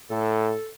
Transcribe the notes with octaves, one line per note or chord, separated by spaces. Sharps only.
A2 A4